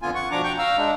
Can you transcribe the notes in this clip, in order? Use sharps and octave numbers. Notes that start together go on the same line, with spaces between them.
F2 D3 B3 F4 G#5
F#5 C#6
B2 F3 D4 A#5 D6
G5 C#6 G6
F5 A#5 E6
G#3 D4